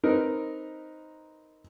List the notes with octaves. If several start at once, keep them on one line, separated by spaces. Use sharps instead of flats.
C4 D#4 A#4 B4